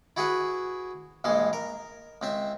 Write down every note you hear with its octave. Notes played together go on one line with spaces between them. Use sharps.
E4 F#4 G#4 B4 E5 F#5
A#1 G2 E3 G#3 C6
A#4
C#2 C4 E5